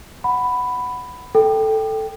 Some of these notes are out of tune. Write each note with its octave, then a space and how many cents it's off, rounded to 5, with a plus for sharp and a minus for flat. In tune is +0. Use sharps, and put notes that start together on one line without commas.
F#5 +0 B5 +10
A4 +0 G5 +0